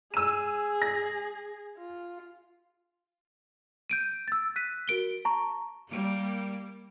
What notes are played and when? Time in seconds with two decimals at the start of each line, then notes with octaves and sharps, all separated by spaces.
0.14 G#4 E6 D#7
0.82 A#6
1.77 F4
3.90 G6 D7 D#7
4.28 E6 A6
4.56 F#6 B6 D#7
4.88 F#4 A#4 D7 G7
5.25 A5 A#5 C#6
5.89 G3 A#3